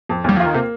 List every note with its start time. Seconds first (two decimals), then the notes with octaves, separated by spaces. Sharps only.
0.09 F2
0.24 D#2 G3
0.37 F3 F4
0.46 D#3
0.54 C3 A#3